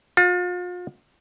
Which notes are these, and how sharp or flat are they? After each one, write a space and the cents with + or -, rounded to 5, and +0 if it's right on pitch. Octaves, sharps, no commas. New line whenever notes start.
F4 +40